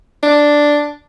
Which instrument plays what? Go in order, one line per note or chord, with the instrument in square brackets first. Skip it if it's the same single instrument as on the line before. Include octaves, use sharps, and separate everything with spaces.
[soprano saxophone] D4